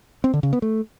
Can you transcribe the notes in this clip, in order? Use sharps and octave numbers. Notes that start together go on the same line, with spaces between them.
C4
D3
C#3
B3
A3